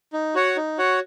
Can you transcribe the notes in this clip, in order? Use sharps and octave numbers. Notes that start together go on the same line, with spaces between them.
D#4
F#4 C#5 F#5
D#4
F#4 C#5 F#5